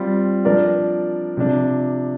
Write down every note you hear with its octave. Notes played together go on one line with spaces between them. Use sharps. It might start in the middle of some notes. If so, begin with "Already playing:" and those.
Already playing: G3 C4 F4
F3 D4 A#4 D5
C3 F3 D4